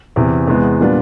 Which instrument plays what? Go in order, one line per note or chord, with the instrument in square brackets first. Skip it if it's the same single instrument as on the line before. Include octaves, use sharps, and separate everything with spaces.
[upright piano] E2 C3 E3
E2 C3 E3 G#3 B3
A#2 G3 B3 D4 F4